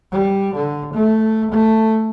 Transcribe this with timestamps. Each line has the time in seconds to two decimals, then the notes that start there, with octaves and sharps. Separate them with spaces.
0.12 G3
0.54 D3
0.94 A3
1.51 A3